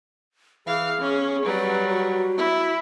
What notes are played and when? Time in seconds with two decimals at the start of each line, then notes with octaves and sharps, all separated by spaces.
0.67 E3 G#4 F5
1.01 C#4
1.45 F#3 G3 B4
1.88 F#4
2.37 E4